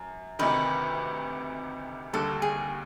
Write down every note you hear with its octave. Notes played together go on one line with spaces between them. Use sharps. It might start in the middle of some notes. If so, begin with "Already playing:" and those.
Already playing: F#2
D2 C3 D#3 B4
D#2 D3 G3 A4
G#4